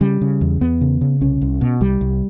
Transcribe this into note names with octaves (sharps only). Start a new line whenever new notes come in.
C#3 G3
C#3
E2
E2 B3
C#3
C#3
C2 C#4
C2
B2
C2 G3
C2